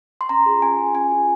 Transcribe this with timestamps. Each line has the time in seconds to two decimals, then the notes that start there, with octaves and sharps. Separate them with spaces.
0.21 C6
0.29 C#4 A#5
0.46 F4 G#4
0.62 C#4 G#5
0.78 F4 G#4
0.94 C#4 G#5
1.11 F4 G#4